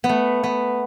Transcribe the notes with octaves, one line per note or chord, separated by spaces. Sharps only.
B3
A3
B3